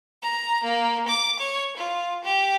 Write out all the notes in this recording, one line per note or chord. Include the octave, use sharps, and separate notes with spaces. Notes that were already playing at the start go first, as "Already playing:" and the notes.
A#5
A#3
D6
C#5
F4
G4